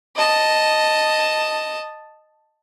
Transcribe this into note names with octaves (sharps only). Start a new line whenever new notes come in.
D#5 A5